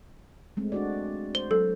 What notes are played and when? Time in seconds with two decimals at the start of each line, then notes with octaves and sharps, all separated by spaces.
0.57 G#3 A3 C4
0.72 D4 F#4 D5
1.35 C5 G7
1.51 F#3 A4